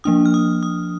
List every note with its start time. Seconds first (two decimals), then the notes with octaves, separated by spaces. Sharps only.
0.04 F3 A#3 D4 D#6
0.26 F6
0.34 D#6
0.63 D#6